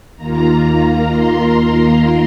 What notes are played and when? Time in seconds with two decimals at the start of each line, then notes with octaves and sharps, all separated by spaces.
0.16 D#2 D#3 A#3 F4 A#5
1.08 C6
1.54 C6